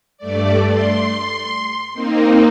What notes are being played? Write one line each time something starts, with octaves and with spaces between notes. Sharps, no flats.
G2 A3 D5
C6
A#3 C4 D#4